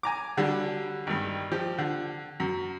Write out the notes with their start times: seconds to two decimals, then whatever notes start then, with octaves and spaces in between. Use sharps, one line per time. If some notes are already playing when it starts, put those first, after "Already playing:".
0.03 G#5 A#5 D6
0.37 D3 F#3 G3
1.07 G#1 G2
1.52 F3 G4
1.78 D3
2.40 F#2